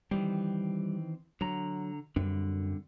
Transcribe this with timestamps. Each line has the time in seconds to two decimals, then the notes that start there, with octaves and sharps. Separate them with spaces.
0.11 D#3 E3 G3 C4
1.41 D3 F#3 A#5
2.16 F#2 D3 G3 C4